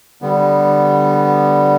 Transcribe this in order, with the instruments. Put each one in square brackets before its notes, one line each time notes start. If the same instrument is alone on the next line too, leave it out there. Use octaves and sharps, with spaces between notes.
[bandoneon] D3 G3 B3